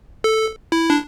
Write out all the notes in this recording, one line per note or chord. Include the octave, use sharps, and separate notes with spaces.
A4
E4
D4